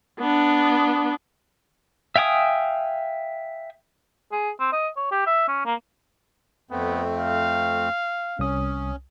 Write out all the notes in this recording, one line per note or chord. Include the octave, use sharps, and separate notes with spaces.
B3 D4
E5 F5 G5 G#5 D#6
G#4
C4
D#5
C#5
G4
E5
C#4
A#3
F2 A3 B3 C4
F5
C2 C#4 D#6